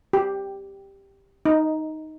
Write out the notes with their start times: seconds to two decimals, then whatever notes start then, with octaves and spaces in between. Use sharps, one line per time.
0.13 G4
1.45 D#4